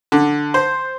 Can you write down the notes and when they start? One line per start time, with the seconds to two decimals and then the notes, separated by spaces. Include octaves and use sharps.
0.12 D3
0.54 C5